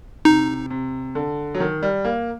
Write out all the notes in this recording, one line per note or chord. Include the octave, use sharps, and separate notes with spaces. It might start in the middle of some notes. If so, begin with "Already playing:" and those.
C3 D#4
C3
D3
F#3
D#3
G3
A#3